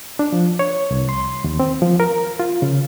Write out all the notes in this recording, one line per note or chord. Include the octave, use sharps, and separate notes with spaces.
D4
F3
C#5
C2
C6
D#2
C4
F3
A#4
F4
C#3